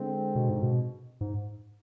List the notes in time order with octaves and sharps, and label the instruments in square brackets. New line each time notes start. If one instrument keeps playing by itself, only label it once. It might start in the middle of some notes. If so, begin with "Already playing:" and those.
Already playing: [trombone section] D3 G#3 C4
[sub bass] B2
G#2
B2
G#2